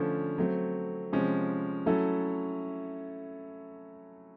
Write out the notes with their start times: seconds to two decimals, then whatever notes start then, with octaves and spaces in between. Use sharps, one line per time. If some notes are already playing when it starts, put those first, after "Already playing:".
Already playing: D3 F3 A3 C#4
0.38 F#3 A3 C4
1.12 C3 F3 G#3 C#4
1.86 F#3 A3 C#4 E4 A4